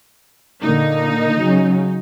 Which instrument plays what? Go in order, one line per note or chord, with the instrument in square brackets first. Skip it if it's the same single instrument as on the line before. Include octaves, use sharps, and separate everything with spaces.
[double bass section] A#2 D3 A#3 [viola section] D#4
[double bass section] C#3 F#3 C#4